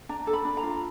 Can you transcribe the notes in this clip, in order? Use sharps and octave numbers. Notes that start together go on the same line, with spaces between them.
D4 A#5
A4
B5
D4
A#5
F4